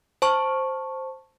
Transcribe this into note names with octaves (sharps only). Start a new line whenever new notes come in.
C5 A5 C#6